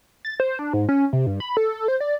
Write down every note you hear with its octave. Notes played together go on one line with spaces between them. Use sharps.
A6
C5
D4
G#2
C#4
C3
G2
B5
A4
C5
D5